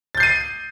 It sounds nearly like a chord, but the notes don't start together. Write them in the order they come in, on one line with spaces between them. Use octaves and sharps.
A6 G6 C7 D#7